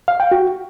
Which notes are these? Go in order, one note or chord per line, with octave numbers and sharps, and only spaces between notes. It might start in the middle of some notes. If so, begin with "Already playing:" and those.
F5
G5
F#4